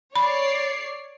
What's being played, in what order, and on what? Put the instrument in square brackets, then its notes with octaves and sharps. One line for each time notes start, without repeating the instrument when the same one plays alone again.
[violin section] C#5 D5 C7 [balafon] B5